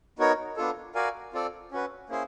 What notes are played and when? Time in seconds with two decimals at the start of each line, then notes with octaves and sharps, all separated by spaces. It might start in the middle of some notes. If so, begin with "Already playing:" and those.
0.19 B3 D#4 F#4 A#4 C#5
0.57 B3 D4 F4 A4
0.95 F#4 A#4 D5 F5 G#5
1.33 C4 F4 A4 D5
1.72 C#4 F#4 B4
2.09 A#3 C#4 E4 G#4 C5